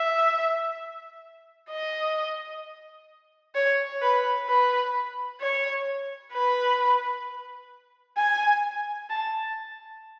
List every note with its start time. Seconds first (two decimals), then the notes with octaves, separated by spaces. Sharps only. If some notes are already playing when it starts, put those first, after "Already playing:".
Already playing: E5
1.71 D#5
3.55 C#5
4.02 B4
4.49 B4
5.41 C#5
6.33 B4
8.17 G#5
9.10 A5